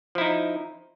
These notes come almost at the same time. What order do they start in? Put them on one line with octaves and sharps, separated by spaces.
F3 E4 D#4